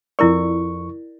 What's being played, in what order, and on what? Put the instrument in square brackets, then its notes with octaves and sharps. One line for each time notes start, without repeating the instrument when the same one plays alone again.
[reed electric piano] F2 C#6 [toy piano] E4 A#4 D5